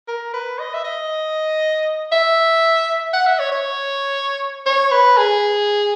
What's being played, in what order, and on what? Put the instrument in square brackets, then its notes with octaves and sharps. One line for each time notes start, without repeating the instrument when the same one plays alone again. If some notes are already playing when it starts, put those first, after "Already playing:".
[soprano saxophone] A#4
B4
D#5
E5
D#5
E5
F#5
E5
C#5
C#5
C#5
B4
G#4